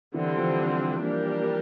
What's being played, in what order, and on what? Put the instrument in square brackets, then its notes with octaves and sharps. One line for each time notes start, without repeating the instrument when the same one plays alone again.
[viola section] D3 G3 C4 [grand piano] E3
[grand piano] F3
[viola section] G3 A#3 D4 G4 A#4